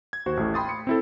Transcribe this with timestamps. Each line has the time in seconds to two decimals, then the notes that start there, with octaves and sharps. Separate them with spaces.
0.13 G#6
0.26 D#2 F#4 C5
0.37 A1 A2
0.54 G5 B5 C6 D#6 A6
0.69 C#7
0.87 C4 E4 A4